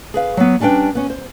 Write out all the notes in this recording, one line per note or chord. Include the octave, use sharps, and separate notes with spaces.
G#4 B4 F5
F#3 B3
G3 C#4 D4 B4 G5
B3 C#4
C5